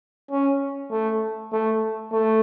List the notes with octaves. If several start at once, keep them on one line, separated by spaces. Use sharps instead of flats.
C#4
A3
A3
A3